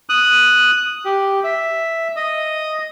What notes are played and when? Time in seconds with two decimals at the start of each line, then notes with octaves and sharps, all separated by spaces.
0.09 D#6 F#6
1.05 G4
1.44 E5
2.16 D#5